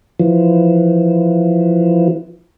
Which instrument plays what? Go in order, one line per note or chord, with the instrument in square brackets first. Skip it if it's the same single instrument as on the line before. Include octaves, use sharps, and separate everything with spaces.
[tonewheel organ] E3 F3